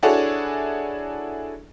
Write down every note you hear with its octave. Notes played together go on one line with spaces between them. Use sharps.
D4 E4 F#4 G#4 A4 C#5